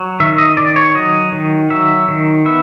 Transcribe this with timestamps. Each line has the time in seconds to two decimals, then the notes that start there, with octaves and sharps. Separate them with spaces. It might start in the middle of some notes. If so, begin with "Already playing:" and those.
Already playing: F#3
0.20 D#3 E5
0.38 D#5
0.57 D#3 D5
0.76 C#5
0.95 F#3 D#5
1.32 D#3
1.70 F#3 E5
2.08 D#3
2.45 B3 E5